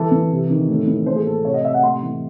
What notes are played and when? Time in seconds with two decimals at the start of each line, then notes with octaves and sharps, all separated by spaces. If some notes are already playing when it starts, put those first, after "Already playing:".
Already playing: E3 A4
0.12 E3
0.31 C3
0.50 D#3
0.68 A2
0.87 E3
1.06 A2 C5
1.16 G#4
1.26 A2 A4
1.44 C3 C#5
1.54 D#5
1.63 C3 E5
1.74 F#5
1.83 A2 C6
2.03 E3